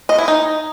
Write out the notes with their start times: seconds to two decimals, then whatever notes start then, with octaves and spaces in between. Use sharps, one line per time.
0.09 D#5
0.18 E4
0.28 D#4